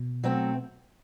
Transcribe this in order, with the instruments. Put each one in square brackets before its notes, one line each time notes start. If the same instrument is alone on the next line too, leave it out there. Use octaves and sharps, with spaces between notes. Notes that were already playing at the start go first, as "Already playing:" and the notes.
Already playing: [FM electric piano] B2
[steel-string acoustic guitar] F#3 A3 C4